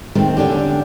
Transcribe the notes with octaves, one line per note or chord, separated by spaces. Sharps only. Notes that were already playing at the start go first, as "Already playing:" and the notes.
D#3 G#3 A3 C4
E2 D3 C#4 D4 G4